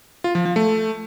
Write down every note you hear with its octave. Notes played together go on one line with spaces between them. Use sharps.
F4
F3
F3
A3